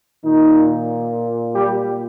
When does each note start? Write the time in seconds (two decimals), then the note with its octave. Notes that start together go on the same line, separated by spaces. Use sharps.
0.23 A#2 D#3 D#4
1.53 G3 G4